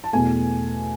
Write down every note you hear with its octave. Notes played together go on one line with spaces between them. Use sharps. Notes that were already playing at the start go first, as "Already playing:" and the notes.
A5
E2 B2 A3 G#5